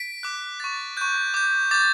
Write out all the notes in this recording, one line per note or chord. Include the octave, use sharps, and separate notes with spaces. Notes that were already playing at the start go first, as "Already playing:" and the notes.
Already playing: B6 D7
D6 F#6
C#6 F#6 A6
C#6 F#6 G6
D6 G6
D6 G6 A6